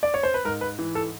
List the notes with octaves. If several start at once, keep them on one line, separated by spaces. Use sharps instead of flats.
D5
C#5
C5
B4
G#2 A#4
B4
E3
A4